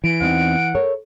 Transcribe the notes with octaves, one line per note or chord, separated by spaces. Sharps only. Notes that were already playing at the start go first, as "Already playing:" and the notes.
E3 D7
E2 C4 D#4 F#5
A4 A#4 C#5